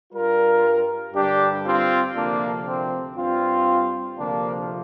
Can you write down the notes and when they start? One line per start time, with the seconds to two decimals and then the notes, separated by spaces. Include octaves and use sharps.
0.13 G2 G3 F4 A#4
1.14 G2 D3 G3 D4 G4
1.65 C4 F4
2.16 D2 C3 F3 A#3 D4
2.66 C4
3.17 G2 G3 C4 F4
4.18 D2 C3 F3 A#3 D4